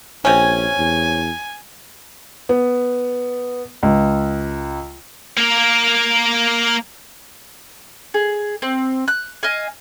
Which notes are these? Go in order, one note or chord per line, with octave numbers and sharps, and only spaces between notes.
A#1 C3 C#4 G#5
E2
B3
C#2
A#3 A#4
G#4
C4
F#6
D#5 F5 G#5